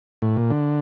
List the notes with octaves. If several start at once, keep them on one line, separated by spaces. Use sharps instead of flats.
A2
A#2
D3